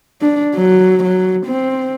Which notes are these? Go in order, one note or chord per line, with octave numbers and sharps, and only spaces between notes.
D4
F#3
F#3
C4